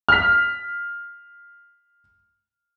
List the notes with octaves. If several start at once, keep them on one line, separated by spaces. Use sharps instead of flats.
F6 B6